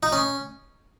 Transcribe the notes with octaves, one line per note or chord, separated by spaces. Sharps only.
D#4
C#4